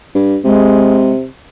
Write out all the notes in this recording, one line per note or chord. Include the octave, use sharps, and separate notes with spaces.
G2
C3 G#3